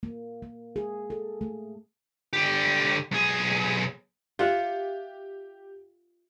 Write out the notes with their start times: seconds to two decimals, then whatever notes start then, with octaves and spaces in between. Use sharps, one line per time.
0.03 A#3
0.42 A#3
0.76 G#4
1.10 A4
1.41 A3
2.33 D3 G4
3.11 B1 G#4
4.39 F4 G4 E5 F#5